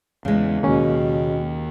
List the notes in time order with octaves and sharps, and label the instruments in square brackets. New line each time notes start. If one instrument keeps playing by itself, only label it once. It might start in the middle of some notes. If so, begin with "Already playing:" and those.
[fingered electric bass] E2 [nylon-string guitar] C#3 G#3
[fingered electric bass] D#2 D#3 [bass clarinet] B2 [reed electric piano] A#3 C#4